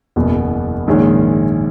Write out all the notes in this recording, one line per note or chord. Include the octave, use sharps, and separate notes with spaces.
F#1 E2 B2
A#1 G#2 D#3 G#3 C#4